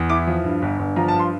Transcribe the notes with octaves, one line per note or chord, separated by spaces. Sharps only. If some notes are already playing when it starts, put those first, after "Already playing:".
Already playing: E2
E4 D6
F3
G2
G1
G1
F3 A#5
A5
G2
C6